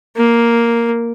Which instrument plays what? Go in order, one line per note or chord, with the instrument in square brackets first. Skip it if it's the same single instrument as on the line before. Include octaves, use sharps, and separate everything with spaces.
[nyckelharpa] A#3